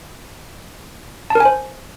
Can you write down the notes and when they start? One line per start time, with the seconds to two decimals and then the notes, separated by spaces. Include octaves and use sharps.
1.30 A5
1.35 A#4
1.40 G#5
1.45 C5